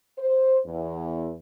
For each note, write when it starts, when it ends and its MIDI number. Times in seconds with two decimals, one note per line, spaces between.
0.19 0.58 72
0.66 1.36 40